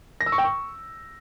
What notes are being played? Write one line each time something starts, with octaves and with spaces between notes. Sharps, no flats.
A#6
E6
C#6
G5
C#6